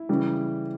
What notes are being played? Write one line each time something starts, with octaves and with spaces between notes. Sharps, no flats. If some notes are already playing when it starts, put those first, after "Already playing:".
Already playing: E4
C#3 E3 G3